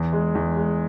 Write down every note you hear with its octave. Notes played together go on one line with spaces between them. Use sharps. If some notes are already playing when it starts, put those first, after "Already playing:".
Already playing: E2
G#3
E2
G#3